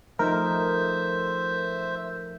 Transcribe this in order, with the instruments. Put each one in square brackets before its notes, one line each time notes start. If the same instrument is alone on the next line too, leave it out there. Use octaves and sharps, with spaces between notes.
[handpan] F3 A3 D#4 [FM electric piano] A#4 [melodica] C5 E5